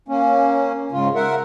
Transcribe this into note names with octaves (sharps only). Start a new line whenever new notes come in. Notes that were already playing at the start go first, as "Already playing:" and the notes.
A#3 C#4
G#2 C#3 F4
A#4 E5 F#5